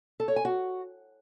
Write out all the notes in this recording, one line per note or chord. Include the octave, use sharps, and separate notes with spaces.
A4
C#5
G#5
F#4